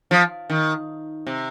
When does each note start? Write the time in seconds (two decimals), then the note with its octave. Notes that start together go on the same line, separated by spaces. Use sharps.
0.11 F3
0.50 D#3
1.27 C3